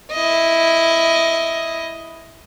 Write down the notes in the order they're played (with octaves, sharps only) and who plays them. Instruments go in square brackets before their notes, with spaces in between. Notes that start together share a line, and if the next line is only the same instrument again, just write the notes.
[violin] E4 D#5